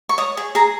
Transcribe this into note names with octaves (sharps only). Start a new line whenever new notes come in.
C#6
C#5 D#6
G#4
G#4 A#5